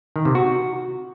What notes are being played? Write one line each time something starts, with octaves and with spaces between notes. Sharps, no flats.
D#3
C3
F#4